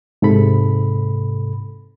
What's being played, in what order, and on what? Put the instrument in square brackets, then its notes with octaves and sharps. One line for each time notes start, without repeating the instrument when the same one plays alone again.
[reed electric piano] G#2 C3 A4 B5